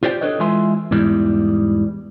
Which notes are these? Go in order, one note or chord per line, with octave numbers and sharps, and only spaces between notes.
F4 G4 C5 D5 G5
D4 A4 B4 C#5 D#5
E3 G#3 F4 E5 G#5 C6
E2 G#2 E3 G3